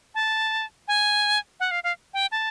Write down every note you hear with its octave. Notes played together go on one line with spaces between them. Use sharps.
A5
G#5
F#5
F5
F5
G5
A5